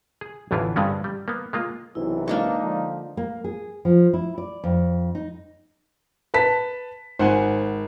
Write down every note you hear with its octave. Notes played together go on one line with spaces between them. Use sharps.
G#4
A1 E2 D3 E3 E4 F4
G2 D3 G3 G#3 C4 C#4
G3
A#3 B3
G#3 A#3 F4
B1 C3 E3 E4
G#3 A#3 D4 D#4 C#6
D3 F3
A#3
G#4
F3
E4
D5
F2
D#4
B4 A5 B6
G#1 C5 F#5 G#5